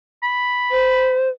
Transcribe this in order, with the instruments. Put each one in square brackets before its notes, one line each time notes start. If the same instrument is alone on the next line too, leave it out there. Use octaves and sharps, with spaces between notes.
[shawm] B5
[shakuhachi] C5